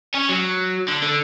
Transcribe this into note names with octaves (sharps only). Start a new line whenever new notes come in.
C#4
F#3
D3
D3